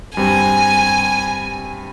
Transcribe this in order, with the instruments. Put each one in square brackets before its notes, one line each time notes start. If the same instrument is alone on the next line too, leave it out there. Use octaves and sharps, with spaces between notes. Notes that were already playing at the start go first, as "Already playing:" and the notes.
[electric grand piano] G2 G3 C4 [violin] G#5